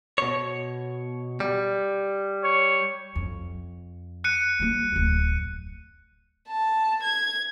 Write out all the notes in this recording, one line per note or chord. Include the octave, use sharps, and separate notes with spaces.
B2 C#5
G3
C#5
F2
F#6 C#7 D#7
G3 A#3
D1 F2
A5
G#6